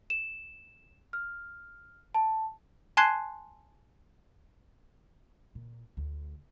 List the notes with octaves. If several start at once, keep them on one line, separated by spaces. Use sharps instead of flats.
E7
F6
A5
G#5 A5 C6 F#6 G#6 C7
A#2
D2